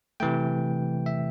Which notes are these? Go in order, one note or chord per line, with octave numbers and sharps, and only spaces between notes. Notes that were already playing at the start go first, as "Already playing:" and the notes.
C3 E3 A3 G5
E5